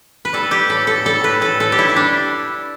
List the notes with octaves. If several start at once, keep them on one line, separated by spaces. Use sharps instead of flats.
B4
G3 A4
G3 G4
A2 A4
A2 A4
G3 A4
A2 B4
A2 A4
A2 A4
G4
G3 E4
E4
G3 D4